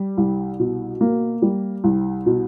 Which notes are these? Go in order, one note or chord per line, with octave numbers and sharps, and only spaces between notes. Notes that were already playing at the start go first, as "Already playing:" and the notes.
Already playing: G3
C2
B2
A#3
G3
C2
B2